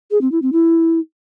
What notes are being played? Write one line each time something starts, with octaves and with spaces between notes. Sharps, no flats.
G#4
C4
E4
C4
E4